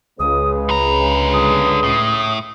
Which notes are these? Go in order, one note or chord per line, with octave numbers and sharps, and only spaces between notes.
C#2 C#3 G#3 B4 D#6
D3 A#5 B5
D#6
A2